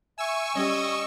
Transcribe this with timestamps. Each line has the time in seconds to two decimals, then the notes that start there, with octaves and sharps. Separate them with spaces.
0.18 E5 G#5 C#6 E6
0.55 G3 C#4 G4 D#5